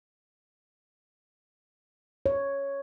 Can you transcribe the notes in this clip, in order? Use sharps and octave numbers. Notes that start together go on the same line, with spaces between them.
C#5